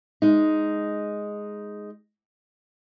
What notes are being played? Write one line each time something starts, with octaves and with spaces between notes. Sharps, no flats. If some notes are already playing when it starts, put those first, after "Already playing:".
G#3 D#4